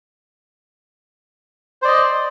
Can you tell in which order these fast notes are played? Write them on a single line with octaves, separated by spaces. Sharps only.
C5 D5 D#5